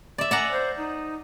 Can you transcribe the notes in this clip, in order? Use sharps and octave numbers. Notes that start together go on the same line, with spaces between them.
D5 E5
D5 F#5 G#5 A#5
C5
D#4